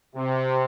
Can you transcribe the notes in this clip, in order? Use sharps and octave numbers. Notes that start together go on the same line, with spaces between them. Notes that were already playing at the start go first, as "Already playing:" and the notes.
C3